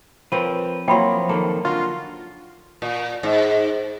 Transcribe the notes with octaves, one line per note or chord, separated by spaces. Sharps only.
F3 C4 A#4 B4 C#5
F3 F#3 A#3 E4 G5 B5 C6
F2 D#3 A#3 A4
D3 F4 F#4 D#5
A#2
G#2